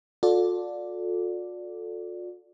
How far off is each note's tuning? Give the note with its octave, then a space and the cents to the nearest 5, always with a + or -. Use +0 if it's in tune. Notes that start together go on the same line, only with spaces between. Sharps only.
F4 +45 A4 +0 D5 +0